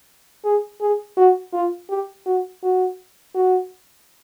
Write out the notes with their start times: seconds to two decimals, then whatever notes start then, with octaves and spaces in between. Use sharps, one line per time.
0.45 G#4
0.81 G#4
1.17 F#4
1.53 F4
1.90 G4
2.26 F#4
2.63 F#4
3.35 F#4